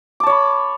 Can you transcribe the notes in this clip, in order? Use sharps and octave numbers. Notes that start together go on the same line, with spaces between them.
C#5 A5 B5 D6